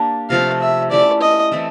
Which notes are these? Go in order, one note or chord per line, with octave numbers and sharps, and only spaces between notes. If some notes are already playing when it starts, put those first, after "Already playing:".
Already playing: A#3 D4 G4
C3 F3 A3 C4 F5
E5
A3 C#4 E4 G4 D5
D#5
E3 A3 C4 E4